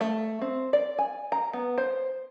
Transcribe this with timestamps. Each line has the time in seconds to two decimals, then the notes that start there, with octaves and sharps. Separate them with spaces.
0.01 A3
0.42 C4
0.73 D5
0.98 G#5
1.32 A#5
1.53 B3
1.78 C5